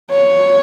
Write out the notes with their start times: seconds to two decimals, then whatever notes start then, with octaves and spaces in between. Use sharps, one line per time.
0.11 C#5